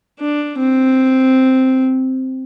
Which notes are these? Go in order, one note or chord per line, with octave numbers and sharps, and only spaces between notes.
D4
C4